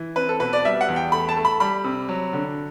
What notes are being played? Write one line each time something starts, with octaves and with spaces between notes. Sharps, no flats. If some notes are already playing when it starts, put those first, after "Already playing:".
Already playing: E3
C4 B4
A4
B2 B4
D5
G3 E5
F#5
E2
G5
A3 B5
A5
A3
B5
G3 B5
C3
F#3
D3